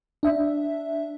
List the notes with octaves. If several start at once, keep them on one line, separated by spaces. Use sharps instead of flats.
D4 E5